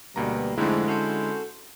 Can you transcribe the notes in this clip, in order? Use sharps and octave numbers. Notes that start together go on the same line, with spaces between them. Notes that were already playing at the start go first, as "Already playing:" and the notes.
D2 B2 G3 A#3 A#5
F2 G#2 D3 G#3 A3 E4
C4 C#4 F#4 A4